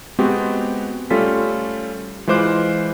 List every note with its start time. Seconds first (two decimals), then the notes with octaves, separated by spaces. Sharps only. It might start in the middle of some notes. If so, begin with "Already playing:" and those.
0.19 G#3 B3 C4 F#4 G4
1.10 G3 A3 C#4 F4 A4 B6
2.27 E3 G#3 F4 C5 D6 F#6